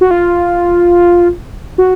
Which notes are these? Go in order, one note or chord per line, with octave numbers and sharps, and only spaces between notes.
F#4
F4
F#4